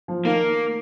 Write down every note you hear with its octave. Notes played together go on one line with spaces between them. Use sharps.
F3
D#3 A#3